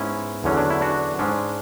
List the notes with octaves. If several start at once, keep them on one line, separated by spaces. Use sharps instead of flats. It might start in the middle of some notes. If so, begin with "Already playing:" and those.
Already playing: G#2 G#3 B3 C#4 E4
E2 D3 F#3 C#4
D4
E4
D4 F#4
G#2 G#3 C#4 D4